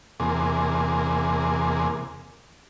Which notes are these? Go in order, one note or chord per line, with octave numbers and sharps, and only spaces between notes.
E2 C3 A#3 G#4